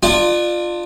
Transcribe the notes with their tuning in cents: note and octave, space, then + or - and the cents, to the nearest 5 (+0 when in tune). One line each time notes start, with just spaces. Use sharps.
D4 +35 F4 +0